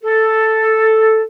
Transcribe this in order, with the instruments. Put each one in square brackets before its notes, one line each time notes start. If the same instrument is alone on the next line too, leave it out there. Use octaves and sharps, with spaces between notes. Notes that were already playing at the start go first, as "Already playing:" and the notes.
[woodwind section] A4